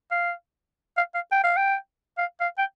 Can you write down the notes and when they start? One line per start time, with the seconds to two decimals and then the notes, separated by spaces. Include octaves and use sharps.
0.11 F5
0.97 F5
1.15 F5
1.32 G5
1.44 F5
1.57 G5
2.18 F5
2.40 F5
2.58 G5